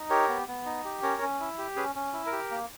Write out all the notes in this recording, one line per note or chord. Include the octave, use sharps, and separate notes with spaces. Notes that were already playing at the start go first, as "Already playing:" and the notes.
Already playing: D#4
G4 A#4 C#5
B3
B3
D#4
G4
C#4 A#4 C#5
C#4
E4
G4
C#4 G#4 B4
C#4
E4
A#4
G4
A#3